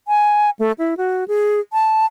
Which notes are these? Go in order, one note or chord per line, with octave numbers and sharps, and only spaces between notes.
G#5
A3
E4
F#4
G#4
A5